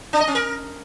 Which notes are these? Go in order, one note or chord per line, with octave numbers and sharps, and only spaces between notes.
D4
D#5
C#4
A#4